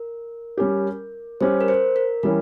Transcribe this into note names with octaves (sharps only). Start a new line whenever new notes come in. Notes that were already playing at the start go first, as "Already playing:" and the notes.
Already playing: A#4
G3 C#4 G4
G3 C#4 G4 C5
A#4
C5
A#4
E3 G3 C#4 A#4